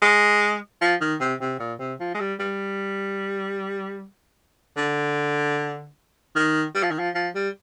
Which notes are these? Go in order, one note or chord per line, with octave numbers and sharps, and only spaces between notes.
G#3
F3
D#3
C3
C3
A#2
C3
F3
G#3
G3
G3
D3
D#3
G3
F3
D#3
F3
F3
G3